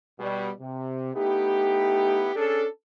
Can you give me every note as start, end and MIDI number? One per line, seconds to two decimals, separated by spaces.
0.20 0.50 47
0.20 0.50 55
0.61 1.12 48
1.16 2.31 57
1.16 2.31 59
1.16 2.31 63
1.16 2.31 64
1.16 2.31 67
2.36 2.66 61
2.36 2.66 62
2.36 2.66 68
2.36 2.66 69